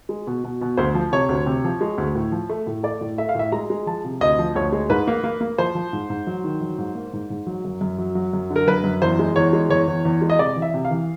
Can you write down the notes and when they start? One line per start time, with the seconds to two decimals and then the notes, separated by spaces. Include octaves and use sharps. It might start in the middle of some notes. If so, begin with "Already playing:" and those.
0.09 G#3
0.27 B2
0.44 B2
0.61 B2
0.77 D2 C5
0.95 F3
1.12 C3 C#5
1.29 D2
1.46 C3
1.64 F3
1.81 G#3
1.98 D2
2.15 A2
2.32 F3
2.50 A3
2.67 A2
2.83 A3 D5
3.01 A2
3.18 A3 E5
3.29 F5
3.35 A2 E5
3.52 G#3 A#5
3.70 G#3
3.87 F3 A5
4.05 C3
4.21 D2 D#5
4.39 F3
4.55 D2 C#5
4.73 G#3
4.89 G#2 B4
5.07 A#3
5.24 A#3
5.41 A#3
5.58 F3 C5
5.75 F3
5.93 G#2
6.10 G#2
6.27 F#3
6.44 D#3
6.61 F#3
6.78 G#2
6.95 A#3
7.13 G#2
7.30 G#2
7.47 F#3
7.65 F#2
7.81 F#2
7.98 F#3
8.15 F#3
8.33 F#2
8.50 D3
8.56 A#4
8.67 F#2 B4
8.84 F#2
9.02 E2 C5
9.19 G#3
9.36 E2 C#5
9.53 G#3
9.70 E2 C#5
9.87 E2
10.05 E2
10.22 G#3
10.30 D#5
10.39 C3 D5
10.56 E3
10.62 E5
10.74 C3
10.85 F5
10.90 E3